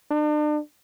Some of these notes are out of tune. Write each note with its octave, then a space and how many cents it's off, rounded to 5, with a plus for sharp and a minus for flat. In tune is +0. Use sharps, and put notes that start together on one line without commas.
D4 +40